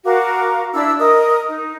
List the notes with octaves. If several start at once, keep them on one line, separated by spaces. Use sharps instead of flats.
F#4 A#4 F5 D6
D4 E4 E6
A#4 D#5 D#6
D#4